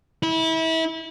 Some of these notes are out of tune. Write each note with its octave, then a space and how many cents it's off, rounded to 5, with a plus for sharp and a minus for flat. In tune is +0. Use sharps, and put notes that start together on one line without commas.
E4 -30